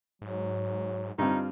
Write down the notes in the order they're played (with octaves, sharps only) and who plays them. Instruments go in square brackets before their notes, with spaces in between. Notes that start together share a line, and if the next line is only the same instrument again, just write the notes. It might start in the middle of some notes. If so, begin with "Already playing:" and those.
[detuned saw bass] G#2 [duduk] F#3
[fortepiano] G2 C4 [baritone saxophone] D#4 [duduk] F4